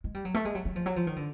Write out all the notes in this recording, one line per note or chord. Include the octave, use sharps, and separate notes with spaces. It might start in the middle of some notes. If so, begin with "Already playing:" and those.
G#3
G3
F#3
A3
G#3
F#3
F#3
F3
F#3
F3
D#3
D3